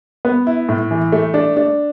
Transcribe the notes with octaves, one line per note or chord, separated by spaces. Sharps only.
B3
E4
A2
E3
A3
D4
D4